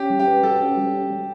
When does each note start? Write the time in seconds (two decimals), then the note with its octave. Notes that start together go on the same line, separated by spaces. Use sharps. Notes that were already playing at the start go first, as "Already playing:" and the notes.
Already playing: C#4 G4
0.10 G3
0.19 G4
0.27 B4
0.43 F#4 A4
0.61 C#4
0.77 G3